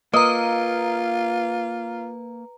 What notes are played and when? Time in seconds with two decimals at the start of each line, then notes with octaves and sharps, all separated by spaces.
0.14 A#3 F4 B4 D#5 A#5